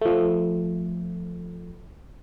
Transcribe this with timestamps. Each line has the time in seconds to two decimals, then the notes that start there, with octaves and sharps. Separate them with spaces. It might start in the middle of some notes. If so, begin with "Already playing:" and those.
0.01 F3 A3